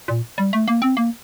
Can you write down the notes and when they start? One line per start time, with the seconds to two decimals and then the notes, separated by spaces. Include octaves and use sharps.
0.08 A#2
0.38 G3
0.53 A3
0.68 A#3
0.82 C4
0.97 A#3